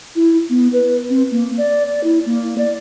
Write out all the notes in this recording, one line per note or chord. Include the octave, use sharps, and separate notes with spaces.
E4
B3
B4
C4
A#3
D5
D5
E4
A#3
D5